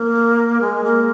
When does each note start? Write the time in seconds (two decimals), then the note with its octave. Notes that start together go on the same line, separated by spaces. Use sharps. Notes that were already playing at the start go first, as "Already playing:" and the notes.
Already playing: A#3
0.61 G#3
0.84 A#3